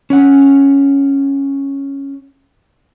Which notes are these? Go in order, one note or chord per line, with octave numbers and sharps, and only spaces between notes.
C#4 C#5 F#5